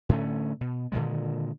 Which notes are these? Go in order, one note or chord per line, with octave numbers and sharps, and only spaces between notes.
A2 D3 A3 C#4
B2
A#2 D3 D#3 G#3